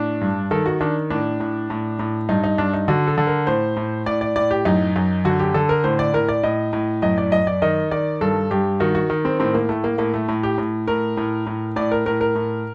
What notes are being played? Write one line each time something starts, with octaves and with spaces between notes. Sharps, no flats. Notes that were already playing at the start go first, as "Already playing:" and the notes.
Already playing: A2 D4
G2
D#3 A4
F#4
D#3 D4
A2 D4
A2
A2
A2
G2 D#4
D#4
G2 D4
D#4
D3 F#4
A4
D3
A#4
A2 C5
A2
A2 D5
D5
A2 D5
G4
F#2 D#4
F#2
D3 F#4
G4
D3 A4
A#4
A2 C5
D5
A2 A#4
D5
A2 D#5
A2
F#2 D#5
D5
F#2 D#5
D5
D#3 D#5
D#3 D5
G2 A4
G2 G4
D#3 F#4
F#4
D#3
C4
A2 C4
A#3
A2 A3
A#3
A2 A#3
A3
A2
G4
A2
A2 A#4
A2
A2
A2 D5
A#4
A2 A#4
A#4
A2